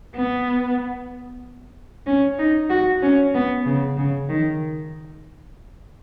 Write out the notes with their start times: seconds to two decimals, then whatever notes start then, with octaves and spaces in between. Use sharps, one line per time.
0.16 B3
2.07 C#4
2.39 D#4
2.70 F#4
3.02 C#4
3.34 B3
3.65 C#3
3.97 C#3
4.29 D#3